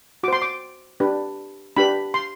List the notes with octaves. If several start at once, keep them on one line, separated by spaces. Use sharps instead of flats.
F#4 C5 C6 D6
D6
D4 G4 B4
D4 G4 B4 B5
C6